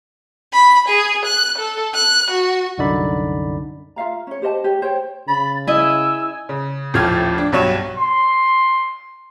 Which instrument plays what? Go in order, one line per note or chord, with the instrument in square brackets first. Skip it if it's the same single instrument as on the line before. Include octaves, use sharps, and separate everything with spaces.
[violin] B5
G#4
F#6
A4
F#6
F#4
[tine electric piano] C2 F#2 D3 D#4 D5 B5
[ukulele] F4 E5 F5 A#5
C#4 C#5
G4 C5 D#5 A5
G4 C#5
C5 C#5 G5
[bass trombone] C#3 [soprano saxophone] B5 [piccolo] A6
[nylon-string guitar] E4 D#5 [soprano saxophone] G#5 [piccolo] E6
[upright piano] C#3
D#1 A1 A2 F3 F6 G#6
D4
B1 G2 F#3 C#5 E7
[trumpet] C6